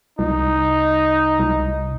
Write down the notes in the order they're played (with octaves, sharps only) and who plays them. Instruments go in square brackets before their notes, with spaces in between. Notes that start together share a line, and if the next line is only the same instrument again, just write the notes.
[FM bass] C2 [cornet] D#4
[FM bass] C2